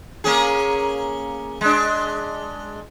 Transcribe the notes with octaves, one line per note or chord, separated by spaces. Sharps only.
A#3 C#4 G#4
G#3 D4